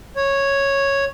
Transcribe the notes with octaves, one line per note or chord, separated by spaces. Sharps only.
C#5